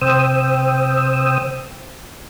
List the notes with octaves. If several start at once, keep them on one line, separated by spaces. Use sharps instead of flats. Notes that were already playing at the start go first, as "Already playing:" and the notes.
C3 C5 G5 D#6 E6